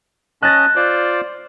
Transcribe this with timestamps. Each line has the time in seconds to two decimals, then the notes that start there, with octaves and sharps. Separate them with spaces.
0.42 C#4 D#5 A5 F#6 A6 A#6
0.76 F4 C5 D5